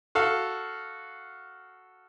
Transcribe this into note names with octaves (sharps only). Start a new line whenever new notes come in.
F#4 A4 F5